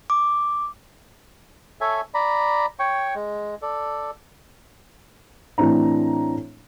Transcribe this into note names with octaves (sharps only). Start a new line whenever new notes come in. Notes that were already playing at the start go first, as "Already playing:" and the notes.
D6
A4 C#5 E5 G#5
D5 A#5 B5
C#5 G5 C#6
G#3
A4 D5
A2 E3 C4 D4 A#5